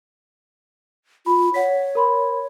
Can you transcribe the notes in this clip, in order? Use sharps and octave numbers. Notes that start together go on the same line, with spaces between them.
F4 B5
C#5 F#5 B6
A#4 B5 C6